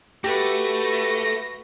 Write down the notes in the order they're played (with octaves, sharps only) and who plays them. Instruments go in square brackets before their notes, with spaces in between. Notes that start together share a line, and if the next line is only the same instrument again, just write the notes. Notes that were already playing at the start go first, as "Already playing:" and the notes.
[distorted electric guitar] A3 [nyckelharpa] F#4 B4 [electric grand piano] G4 [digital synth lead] A#6